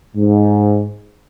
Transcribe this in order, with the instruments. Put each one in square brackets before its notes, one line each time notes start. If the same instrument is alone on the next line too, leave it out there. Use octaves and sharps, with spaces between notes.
[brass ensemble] G#2